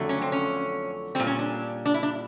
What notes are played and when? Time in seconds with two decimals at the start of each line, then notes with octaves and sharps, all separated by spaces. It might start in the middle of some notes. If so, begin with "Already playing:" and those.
Already playing: F2 D3 F#3 A3
0.09 C#4
0.22 C4
0.32 C#4
1.15 A#2 G3 C4
1.27 C#4
1.39 D4
1.86 D4
1.94 E4
2.03 D4